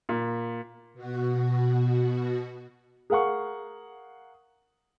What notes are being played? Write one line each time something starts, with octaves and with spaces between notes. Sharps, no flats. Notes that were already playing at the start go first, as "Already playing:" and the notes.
A#2
B2 F#4
G#4 A#4 F5 F#5 C#6